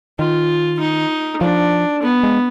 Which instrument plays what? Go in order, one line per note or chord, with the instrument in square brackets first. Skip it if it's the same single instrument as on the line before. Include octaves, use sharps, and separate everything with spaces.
[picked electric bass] D#3 [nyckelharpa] F4
[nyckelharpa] D#4
[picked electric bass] F3 [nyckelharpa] D4
[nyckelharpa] B3
[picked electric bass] G#3